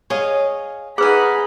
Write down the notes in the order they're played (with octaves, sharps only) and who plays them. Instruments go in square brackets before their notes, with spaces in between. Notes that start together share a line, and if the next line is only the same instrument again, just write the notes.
[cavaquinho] G#4 D#5 F5 [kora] C#5
[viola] D#4 B5 [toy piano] G#4 B4 [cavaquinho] F#5 G#5